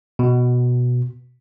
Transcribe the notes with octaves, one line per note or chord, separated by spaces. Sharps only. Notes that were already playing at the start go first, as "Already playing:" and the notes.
B2